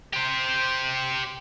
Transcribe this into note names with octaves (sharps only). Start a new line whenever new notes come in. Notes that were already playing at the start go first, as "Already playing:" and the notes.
G4 C5